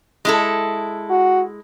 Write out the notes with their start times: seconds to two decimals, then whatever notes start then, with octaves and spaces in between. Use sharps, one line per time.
0.25 G#3 E4 A4
1.10 F#4